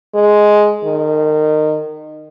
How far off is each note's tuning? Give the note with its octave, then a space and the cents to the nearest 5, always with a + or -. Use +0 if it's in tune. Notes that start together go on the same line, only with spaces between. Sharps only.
G#3 +5
D#3 -25